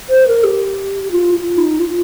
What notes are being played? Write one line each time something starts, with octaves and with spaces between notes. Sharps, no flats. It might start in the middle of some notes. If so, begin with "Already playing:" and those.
C5
A#4
G4
F4
F4
D#4
F4